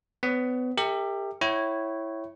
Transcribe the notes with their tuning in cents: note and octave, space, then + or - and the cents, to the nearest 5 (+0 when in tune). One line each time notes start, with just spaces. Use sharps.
B3 +30 C#5 +30
G4 +20 A#4 -40 E5 -25
E4 +0 C#5 -10 G5 -45